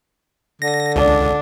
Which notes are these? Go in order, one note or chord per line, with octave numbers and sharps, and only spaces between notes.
D3 A#6
C#2 D4